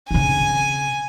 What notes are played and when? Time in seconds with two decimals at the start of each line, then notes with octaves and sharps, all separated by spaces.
0.11 C#3 C4 G#5